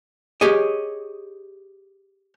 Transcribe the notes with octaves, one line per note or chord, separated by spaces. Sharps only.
G4 G#4 C#5 D#5